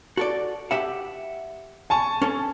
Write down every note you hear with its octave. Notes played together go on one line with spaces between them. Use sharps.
F#4 A4 D5
G4 E5 F#5
G#5 A5 C#6
C#4 A4